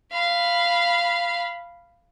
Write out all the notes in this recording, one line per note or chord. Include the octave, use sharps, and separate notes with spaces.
F5 B5